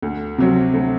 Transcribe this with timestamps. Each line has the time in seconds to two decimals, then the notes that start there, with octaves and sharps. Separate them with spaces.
0.02 D2
0.38 C3 F#3 C4
0.74 D2